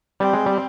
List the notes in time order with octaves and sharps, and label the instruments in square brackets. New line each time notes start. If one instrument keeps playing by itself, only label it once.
[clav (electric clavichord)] G3 [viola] C4
[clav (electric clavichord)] G#3
G3